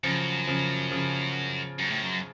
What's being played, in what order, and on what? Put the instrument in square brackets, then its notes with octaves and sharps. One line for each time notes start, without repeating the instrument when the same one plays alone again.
[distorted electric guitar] F#2 [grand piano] C#3 F3
[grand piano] C#3 F3
C#3 F3
[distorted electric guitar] F#2
A2
F#2